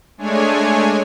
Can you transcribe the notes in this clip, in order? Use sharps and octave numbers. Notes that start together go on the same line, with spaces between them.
G#3 A3 D4 C#5 G#5